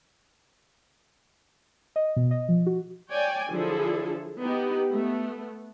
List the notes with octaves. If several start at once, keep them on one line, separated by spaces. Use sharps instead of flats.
D#5
B2
D#5
F3
F#4
C#5 D5 G5 G#5
D3 F3 F#3 E4 G#4 A4
B3 D#4 G4
A3 B3